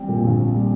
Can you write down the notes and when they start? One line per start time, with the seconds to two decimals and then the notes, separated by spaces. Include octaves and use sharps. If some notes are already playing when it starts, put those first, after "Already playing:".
Already playing: G3 C4
0.08 A#2
0.24 A#1
0.39 C4
0.54 G3